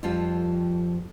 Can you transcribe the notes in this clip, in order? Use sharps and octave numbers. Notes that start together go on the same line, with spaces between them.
F2 F3 G3 F4 A4